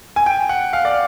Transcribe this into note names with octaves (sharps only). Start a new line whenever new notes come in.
G#5
G5
F#5
F5
D5